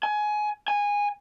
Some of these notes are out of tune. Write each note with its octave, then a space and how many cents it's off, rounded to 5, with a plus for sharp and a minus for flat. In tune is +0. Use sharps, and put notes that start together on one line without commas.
G#5 +20
G#5 -15